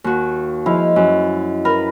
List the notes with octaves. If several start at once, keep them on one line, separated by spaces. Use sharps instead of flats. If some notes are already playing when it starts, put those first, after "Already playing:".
D#2 F#4
F3 G#3 E4 F5
F#2
A#4 B4